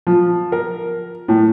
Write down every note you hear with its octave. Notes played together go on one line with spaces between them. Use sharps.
F3
A#4
A2